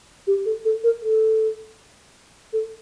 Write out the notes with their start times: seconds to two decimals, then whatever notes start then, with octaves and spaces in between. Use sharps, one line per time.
0.27 G4
0.46 A4
0.65 A4
0.84 A#4
1.02 A4
2.53 A4